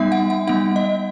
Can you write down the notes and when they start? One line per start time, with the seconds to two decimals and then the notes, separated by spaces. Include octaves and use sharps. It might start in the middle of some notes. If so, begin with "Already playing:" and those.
Already playing: G3 B3 D#4 E5
0.12 F#5
0.30 F#5
0.47 G3 B3 D#4 F#5
0.76 D#5